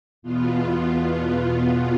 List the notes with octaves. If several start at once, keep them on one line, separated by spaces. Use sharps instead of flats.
E2 B2 B3 F4